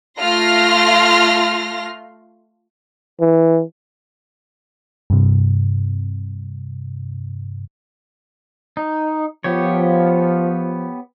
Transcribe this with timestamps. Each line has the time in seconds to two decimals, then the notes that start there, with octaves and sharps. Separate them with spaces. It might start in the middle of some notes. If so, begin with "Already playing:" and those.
0.19 A3 F4 C6 F6 A#6
3.20 E3
5.10 G2 C3
8.77 D#4
9.44 F3 B3 G4 C#5